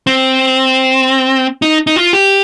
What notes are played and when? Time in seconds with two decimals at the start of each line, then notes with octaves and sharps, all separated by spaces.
0.07 C4
1.62 D#4
1.87 D#4
1.96 F4
2.13 G4